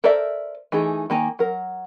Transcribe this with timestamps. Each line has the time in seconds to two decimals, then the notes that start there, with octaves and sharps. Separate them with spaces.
0.04 A4 A#4 C5 D5 E5
0.72 E3 A3 D#4 G#4
1.10 D#3 A#3 G#5 A#5
1.39 F#3 A#4